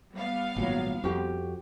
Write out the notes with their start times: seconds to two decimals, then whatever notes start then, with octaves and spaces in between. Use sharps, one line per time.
0.14 G3 B3 F5
0.56 G#1 A#2 F#3
1.04 F2 F#4 G4